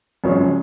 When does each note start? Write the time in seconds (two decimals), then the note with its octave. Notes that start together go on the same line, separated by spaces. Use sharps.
0.24 G#1 F#2 C#3 F3 G#3 C#5